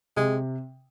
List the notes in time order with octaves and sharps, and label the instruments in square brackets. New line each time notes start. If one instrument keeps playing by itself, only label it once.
[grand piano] C3 [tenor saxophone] G#3